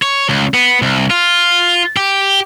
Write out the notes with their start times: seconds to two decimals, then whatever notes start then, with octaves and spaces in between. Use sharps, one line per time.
0.02 C#5
0.29 C#2
0.54 B3
0.82 C2
1.10 F4
1.97 G4